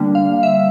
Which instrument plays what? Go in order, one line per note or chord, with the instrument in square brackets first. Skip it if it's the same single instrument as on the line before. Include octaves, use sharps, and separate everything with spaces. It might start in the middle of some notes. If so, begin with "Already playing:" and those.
Already playing: [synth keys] D3 G3 A#3 D4
F5
E5